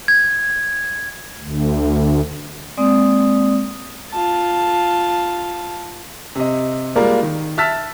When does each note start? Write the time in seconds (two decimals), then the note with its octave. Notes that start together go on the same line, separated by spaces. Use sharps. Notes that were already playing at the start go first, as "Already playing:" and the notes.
0.08 G#6
1.39 D2
2.78 G#3 A#3 C4 D5 D#6
4.11 F4 A5
6.35 C3 D#5
6.96 G3 G#3 A#3 F4 A#4 D5
7.23 D#3
7.57 E5 A5 E6 F6 A6 B6